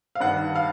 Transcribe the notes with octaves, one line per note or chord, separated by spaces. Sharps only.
F5
G2 D#3 F#5
F5